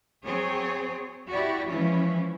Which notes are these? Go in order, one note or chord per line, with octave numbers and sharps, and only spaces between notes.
F#3 C4 G#4 C#5
E4 F#4 G4 D5
E3 F3 G#3 C#4 E4